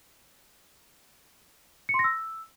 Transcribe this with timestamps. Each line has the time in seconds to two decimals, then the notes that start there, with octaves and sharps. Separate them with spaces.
1.89 C#7
1.94 C6
1.99 A#6
2.04 E6